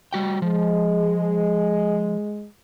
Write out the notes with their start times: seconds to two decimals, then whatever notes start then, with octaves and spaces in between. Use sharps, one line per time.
0.13 G3 F#4 G5
0.42 F3 G#3